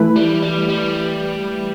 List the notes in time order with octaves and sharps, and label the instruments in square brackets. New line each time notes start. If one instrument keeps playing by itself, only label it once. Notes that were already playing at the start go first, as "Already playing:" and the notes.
Already playing: [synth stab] E3 A3 E4 B4
[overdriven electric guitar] G3
G3
G3